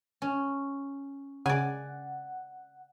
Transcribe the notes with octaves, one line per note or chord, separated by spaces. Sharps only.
C#4
C#3 D5 F#5 G#5